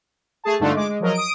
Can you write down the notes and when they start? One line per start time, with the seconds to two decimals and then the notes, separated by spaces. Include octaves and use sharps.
0.44 A3 G#4 A5
0.60 G2 D3 A3 D4 D#4 F4
0.75 G#3 D6
0.88 G#3
1.00 F3 F#3 A#4 D#5
1.13 D#6 D7